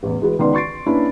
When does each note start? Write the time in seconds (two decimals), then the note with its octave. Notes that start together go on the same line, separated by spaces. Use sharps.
0.03 A1 E2
0.21 E3 G#3 F#4 G#4 B4
0.39 C#2 D#3 B3 B4 D5 C6
0.54 C6 C#6 A6 C7 D7
0.86 A#3 C#4 D4 E4 B4